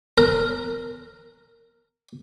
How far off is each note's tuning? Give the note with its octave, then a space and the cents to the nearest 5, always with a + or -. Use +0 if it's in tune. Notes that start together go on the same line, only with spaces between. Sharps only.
A#4 -10